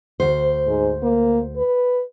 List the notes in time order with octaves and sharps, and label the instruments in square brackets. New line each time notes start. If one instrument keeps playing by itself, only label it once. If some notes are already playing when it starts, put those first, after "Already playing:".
[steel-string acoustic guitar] D2 C5
[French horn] G#2
A#3
B4